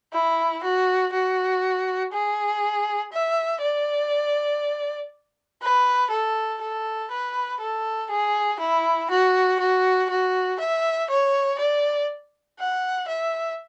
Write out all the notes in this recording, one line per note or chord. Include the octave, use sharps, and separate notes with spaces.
E4
F#4
F#4
G#4
E5
D5
B4
A4
A4
B4
A4
G#4
E4
F#4
F#4
F#4
E5
C#5
D5
F#5
E5